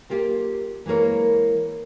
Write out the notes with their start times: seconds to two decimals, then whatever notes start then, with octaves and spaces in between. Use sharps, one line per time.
0.10 A#3 F4 G4
0.86 E3 G#3 A#3 A#4 C#5